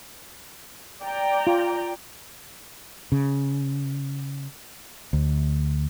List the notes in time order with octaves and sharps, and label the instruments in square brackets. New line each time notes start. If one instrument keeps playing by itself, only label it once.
[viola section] D5 G5 A#5
[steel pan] F4
[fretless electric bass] C#3
D2